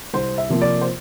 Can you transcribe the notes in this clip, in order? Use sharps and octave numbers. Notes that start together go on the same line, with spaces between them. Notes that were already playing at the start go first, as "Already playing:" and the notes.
C2 C5
E5
C3 F3 A#3
D5
C5